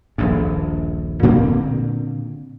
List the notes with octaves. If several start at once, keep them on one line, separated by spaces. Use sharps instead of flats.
D#1 A#1 G2
A#2 D3 A#3 C4